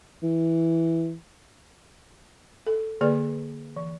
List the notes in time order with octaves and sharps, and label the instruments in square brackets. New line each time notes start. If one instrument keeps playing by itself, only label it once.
[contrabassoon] E3
[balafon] A4
D3 A#3 G#4 B4 D5
E3